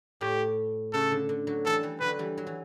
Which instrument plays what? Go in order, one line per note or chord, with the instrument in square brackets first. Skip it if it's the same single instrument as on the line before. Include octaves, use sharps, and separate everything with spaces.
[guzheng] A2 [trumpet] G4
[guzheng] C#3 [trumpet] A4
[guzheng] D3
D3
D3 F#3
[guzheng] E3 G3 [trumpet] A4
[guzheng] E3 G3
[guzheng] D3 F#3 [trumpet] B4
[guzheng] E3 G3
F#3
E3